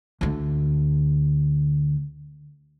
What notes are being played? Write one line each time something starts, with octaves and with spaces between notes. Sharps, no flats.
D2 D3